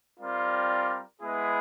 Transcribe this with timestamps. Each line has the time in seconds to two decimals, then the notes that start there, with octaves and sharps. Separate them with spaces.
0.20 G3 C4 F4 A#4 D5
1.22 G#3 B3 E4 G#4 B4